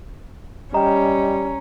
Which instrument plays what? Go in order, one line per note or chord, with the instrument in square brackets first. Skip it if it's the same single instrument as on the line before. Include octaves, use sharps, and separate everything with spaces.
[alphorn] G3 [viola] C#4 [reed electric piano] D#5 G5 [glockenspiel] A#5